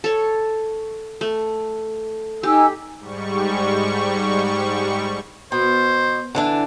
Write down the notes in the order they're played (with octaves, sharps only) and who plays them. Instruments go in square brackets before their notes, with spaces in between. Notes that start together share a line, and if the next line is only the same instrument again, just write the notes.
[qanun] A4 C#5
A3
[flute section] D#4 G#5 E6 [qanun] G4
[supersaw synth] G#2 G3 C#6
[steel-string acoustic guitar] B2 [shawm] C5
[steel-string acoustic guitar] D3 E3 D4